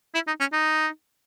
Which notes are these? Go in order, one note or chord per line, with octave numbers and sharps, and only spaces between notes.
E4
D#4
C#4
D#4